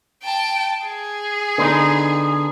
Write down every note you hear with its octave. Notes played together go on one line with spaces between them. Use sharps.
G5 A5
G#4
D3 B3 D#4